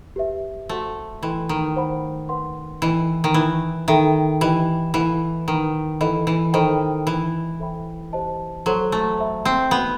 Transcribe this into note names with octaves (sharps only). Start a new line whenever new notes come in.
G4 B4 E5
A3 F#4 C5 F#5 C6
E3 A4 D#5 G5 C6
D#3
C5 F#5 B5
B4 F#5 C6
E3 A4 D#5 G5 B5
D#3
E3 E4 B4 E5
D#3 A4 E5 G5 B5
E3 G4 D#5 G5
E3 A4 D#5 F#5 B5
D#3 B4 F#5 B5
E3 A4 D#5 F#5 B5
E3
D#3 A4 C5 D#5 G5 B5
E3 E4 B4 D#5
A4 C5 E5 G5 B5
G4 C5 D#5 A5
F#3 A4 C5 F#5 C6
A3
C5 E5 B5
C4
B3 D#4 F#4 A4 D#5